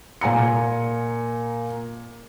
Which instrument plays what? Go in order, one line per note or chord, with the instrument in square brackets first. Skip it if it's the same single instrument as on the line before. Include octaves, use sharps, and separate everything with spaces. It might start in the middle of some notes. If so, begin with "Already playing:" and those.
[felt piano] A#2 G#5 A#5 C#7